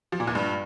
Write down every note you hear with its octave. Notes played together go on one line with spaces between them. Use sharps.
F3
A#2
E2
G2